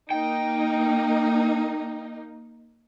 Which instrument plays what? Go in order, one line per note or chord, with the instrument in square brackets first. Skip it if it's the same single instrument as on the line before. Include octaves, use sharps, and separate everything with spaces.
[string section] A#3 D#4 [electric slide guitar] G5